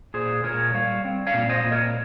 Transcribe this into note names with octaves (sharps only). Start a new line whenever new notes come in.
A#2 G#4 C5
A#2 A#4 C#5
G3 C#5 F5
C4
C#5 F5
A#2
C5 D#5
A#2
A#4 C#5